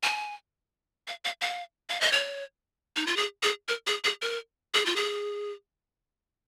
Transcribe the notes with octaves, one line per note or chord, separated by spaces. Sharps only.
G#5
F5
F5
F5
F5
D#5
C#5
D#4
F4
G#4
G#4
A#4
G#4
G#4
A#4
G#4
F4
G#4